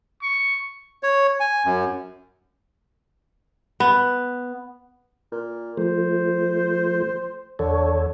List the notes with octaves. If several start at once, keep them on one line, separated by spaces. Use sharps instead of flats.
C#6
C#5
G#5
F#2
B3
A#2
F3 A3 C5
E2 D3 A4 C#5